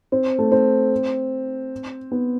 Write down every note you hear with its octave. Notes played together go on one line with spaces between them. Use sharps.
C4
A3
C4
B3